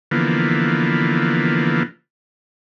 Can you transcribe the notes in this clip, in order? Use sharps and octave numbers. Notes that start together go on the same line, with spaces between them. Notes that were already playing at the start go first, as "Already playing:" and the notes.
D3 E3 F3 A#3 B3